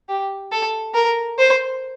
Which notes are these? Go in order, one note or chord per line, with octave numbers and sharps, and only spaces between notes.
G4
A4
A#4
C5